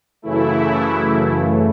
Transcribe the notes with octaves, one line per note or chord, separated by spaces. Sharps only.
F#2 C#3 E3 A3 E4